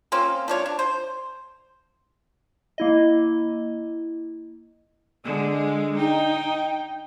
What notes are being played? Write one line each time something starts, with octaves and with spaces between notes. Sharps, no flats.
A#3 C4 C#4 F4
F3 D4 C#5
D4
C5
A#3 E4 D#5
D3 G#3
D#4 G5